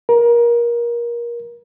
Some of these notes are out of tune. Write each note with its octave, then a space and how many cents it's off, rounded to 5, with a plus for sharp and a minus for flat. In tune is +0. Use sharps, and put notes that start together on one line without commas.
A#4 +25